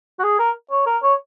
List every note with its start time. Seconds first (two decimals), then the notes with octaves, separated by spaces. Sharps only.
0.19 F#4
0.23 G#4
0.39 A#4
0.71 C#5
0.86 A#4
1.03 C#5